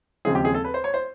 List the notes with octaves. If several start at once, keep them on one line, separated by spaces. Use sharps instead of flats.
D#2 C#3 F3 G#3 C4 G#4
G4
G#4
A4
B4
C5
C#5
C5